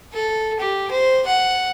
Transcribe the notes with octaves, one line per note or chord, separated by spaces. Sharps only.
A4
G4
C5
F#5